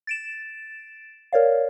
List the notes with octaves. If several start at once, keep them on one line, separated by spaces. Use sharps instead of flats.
A6 D7 E7
A#4 C#5 D5 F5